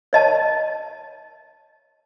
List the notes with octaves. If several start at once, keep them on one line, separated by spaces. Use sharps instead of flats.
C#5 D#5 A5